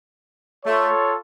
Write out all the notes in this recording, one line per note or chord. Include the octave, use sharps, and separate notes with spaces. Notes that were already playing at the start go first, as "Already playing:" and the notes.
A3 F4 A4 C#5